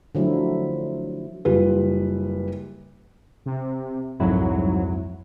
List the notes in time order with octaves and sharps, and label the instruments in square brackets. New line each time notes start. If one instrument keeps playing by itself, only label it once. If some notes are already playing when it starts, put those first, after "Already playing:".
[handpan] D3 F3 F#3 A3 E4
[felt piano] F#1 G3 F4 B4
[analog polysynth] C3
[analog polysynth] C2 G#2 F#3 [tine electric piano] F2 E4